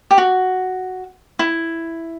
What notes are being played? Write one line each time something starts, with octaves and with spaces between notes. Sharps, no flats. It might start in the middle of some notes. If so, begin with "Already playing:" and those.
G4
F#4
E4